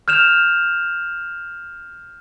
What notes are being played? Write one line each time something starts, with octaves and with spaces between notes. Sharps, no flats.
F6 G6 E7 F7